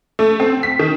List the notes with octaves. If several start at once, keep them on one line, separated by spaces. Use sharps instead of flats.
A3
C4
B6
D#3